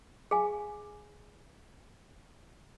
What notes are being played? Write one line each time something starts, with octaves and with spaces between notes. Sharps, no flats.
G#4 F5 G#5